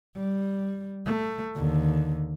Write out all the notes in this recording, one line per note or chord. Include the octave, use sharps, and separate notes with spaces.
G3
A3
D#2 D3